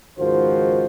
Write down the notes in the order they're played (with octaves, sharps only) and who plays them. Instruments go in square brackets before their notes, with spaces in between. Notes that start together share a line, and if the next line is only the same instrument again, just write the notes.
[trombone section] C#2 G#2 D#3 F3 F#4 C5